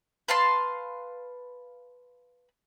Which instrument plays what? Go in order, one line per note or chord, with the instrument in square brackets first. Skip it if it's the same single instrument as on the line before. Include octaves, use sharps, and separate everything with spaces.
[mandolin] B4 F5 A5 C6